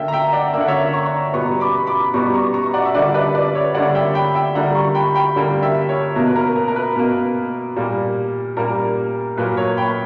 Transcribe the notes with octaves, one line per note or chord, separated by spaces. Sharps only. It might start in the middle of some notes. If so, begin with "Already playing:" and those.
Already playing: D3 A#3 E5 G5
A#5
E5 G5
D5 F#5
D3 A#3 E5 F#5
C#5 E5
A#5 C#6
B2 G3 B3 A#5 C#6
B5 D6
B5 D6
B2 G3 B3 A#5 C#6
A#5 C#6
A#5 C#6
D5 F#5
E5
D3 G3 A#3 D5 F#5
B4 D5
B4 D5
C#5 E5
D3 G3 A#3 D5 F#5
E5 G5
G5 B5
E5 G5
D3 G3 A#3 F#5 A#5
A#5 C#6
G5 B5
G5 B5
D3 G3 A#3
E5 G5
A#4 C#5
B2 A#3 A#4
B4
A#4
A#4
A#4
B4
B2 A#3
A#2 G3 A#3
A#2 G3 A#3 A#4
A#2 F#3 A#3 B4
A#4 C#5
G5 B5
B5